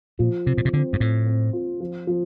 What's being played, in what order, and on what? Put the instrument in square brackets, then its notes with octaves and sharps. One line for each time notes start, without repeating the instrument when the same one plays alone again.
[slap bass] A#2 [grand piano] F3
[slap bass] C3 [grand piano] C4
[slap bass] A#2
C3
[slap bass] D3 [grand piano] C4
[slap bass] G2
[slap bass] A2 [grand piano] C4
[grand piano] C4
F4
F3
F3